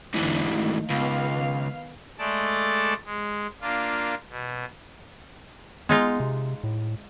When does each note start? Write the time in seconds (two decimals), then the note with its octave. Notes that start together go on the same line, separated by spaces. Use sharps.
0.14 E2 G#2 D3 E3
0.52 D#3 A3
0.90 C#2 D#3 B3 F5
2.18 G#3 A3 A4 D5 A5
3.05 G#3
3.61 A#3 D4 F4
4.30 B2
5.89 G#3 B3 D#4 F4
6.20 C3
6.64 A2